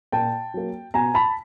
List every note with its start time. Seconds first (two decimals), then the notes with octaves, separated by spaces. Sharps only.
0.12 A#2 G5 A5
0.54 F#3 A#3
0.94 B2 G#5 A#5
1.14 A5 B5